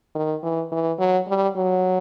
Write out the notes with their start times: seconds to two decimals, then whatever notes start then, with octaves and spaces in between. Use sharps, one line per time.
0.15 D#3
0.43 E3
0.72 E3
0.99 F#3
1.28 G3
1.56 F#3